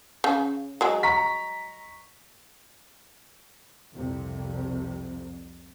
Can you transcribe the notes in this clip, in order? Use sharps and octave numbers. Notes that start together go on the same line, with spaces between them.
C#3
F#3 G#3
A#5 C#6 B6
C2 F2 C3